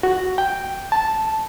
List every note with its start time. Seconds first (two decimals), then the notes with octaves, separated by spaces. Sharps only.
0.03 F#4
0.38 G5
0.92 A5